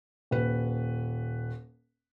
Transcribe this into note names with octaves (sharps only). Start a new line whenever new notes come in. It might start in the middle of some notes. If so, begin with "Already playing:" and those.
D#1 B4